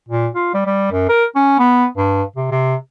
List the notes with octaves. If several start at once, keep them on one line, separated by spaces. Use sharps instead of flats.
A#2
F4
G3
G3
F#2
A#4
C#4
B3
G2
C3
C3